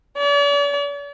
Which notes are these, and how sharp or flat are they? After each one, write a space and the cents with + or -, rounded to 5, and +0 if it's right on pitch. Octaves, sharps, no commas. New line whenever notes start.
D5 -45